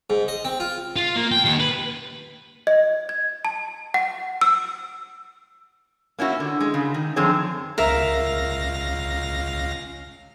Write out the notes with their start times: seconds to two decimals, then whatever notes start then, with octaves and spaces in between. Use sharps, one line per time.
0.10 G#2
0.28 D#5
0.45 C4
0.60 F4
0.96 F4
1.16 A#3
1.32 G5
1.45 D#2
1.60 B4
2.67 D#5
3.09 G#6
3.45 A5
3.94 F#5
4.41 E6
6.19 A#3 C#4 E4 F#4
6.40 D3
6.60 G#3
6.74 C#3
6.94 D#3
7.16 F#2 D3 F3 C4 G#4 C#5
7.78 C#2 A#4 E5 F5 A#6